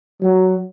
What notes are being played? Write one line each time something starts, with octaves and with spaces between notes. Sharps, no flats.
F#3